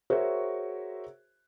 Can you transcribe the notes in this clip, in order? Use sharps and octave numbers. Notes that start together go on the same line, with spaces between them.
F#4 G#4 A#4 C5 C#5 E5